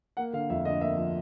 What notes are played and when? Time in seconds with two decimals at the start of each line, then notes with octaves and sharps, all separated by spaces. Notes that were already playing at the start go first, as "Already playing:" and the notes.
0.17 A#3 F#5
0.33 D3 F5
0.50 F2 E5
0.65 D3 D#5
0.81 A#3 E5
0.97 F3